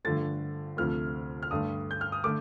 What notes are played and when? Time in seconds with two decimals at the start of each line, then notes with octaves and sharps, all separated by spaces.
0.05 G2 D3 F3 A3 A6
0.77 D2 C3 F3 A3 F6
1.43 F6
1.51 G2 D3 A3 D#6
1.91 G6
2.01 F6
2.12 D#6
2.24 D3 A3 D6